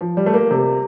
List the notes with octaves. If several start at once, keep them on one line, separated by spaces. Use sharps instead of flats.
F3
G3
A3
A#3
C3